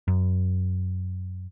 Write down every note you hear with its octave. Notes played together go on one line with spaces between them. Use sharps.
F#2